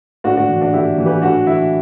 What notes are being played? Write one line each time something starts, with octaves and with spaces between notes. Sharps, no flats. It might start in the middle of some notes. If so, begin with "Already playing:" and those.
A2 D4 F#4
D4 F#4
E3
D4
A2 E4 G4
E3
G4 B4
A2 D4 F#4
E3 E4